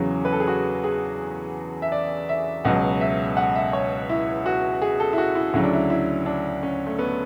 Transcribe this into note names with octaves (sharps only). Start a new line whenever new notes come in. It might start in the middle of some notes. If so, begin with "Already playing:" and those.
Already playing: E2 C#3 F#3
B4
A4
G#4
F#4
G#4
E5
D5
E5
C#2 B2 F#3 F#5
E5
F#5
E5
C#5
E4
F#4
G#4
A4
E4
F#4
E4
D2 C#3 F#3 E4
D4
E4
E4
D4
C#4
A3
B3